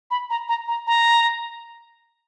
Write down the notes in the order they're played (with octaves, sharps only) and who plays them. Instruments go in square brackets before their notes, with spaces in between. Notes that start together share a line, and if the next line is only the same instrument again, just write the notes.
[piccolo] B5
A#5
A#5
A#5
A#5